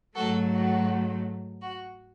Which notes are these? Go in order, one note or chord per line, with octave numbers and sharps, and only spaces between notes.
G#2 F#3 A3 F#4 A4
F#4
F#4